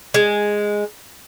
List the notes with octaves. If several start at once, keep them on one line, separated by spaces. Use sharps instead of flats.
G#3